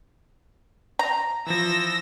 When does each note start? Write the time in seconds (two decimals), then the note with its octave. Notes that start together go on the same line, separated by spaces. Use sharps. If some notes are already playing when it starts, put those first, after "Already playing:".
0.99 A#5
1.47 E3 F3 E6 A#6